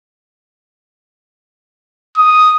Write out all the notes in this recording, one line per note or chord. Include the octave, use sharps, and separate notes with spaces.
D#6